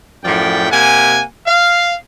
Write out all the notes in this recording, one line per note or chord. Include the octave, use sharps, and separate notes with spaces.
F#2 A2 F3 D5 G5
C3 A#3 F#5 G#5
F5